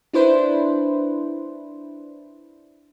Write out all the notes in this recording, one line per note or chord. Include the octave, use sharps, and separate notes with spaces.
D4 E4 B4 C5